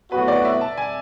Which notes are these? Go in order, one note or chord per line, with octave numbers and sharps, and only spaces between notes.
A2 F#3 B3 F#4 B4
D5
E5
A5
G#5